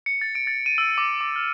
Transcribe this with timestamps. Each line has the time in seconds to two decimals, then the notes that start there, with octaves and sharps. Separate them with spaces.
0.06 C#7
0.21 A6
0.35 D7
0.47 A6
0.66 D#7
0.78 E6
0.98 D6
1.21 D6
1.36 F6